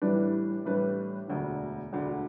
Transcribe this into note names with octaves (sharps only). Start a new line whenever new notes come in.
A2 E3 G3 D4 B4
A2 E3 G3 D4 B4
E1 D2 D3
E1 D2 D3